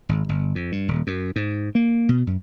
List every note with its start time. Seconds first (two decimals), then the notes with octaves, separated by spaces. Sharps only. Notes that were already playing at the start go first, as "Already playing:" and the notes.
0.09 G#1
0.29 G1
0.55 F2
0.72 G2
0.88 D#1
1.07 F#2
1.36 G#2
1.75 A#3
2.09 B2
2.27 F#2